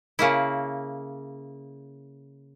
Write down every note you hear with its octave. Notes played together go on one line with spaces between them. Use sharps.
C#3 A#3 E4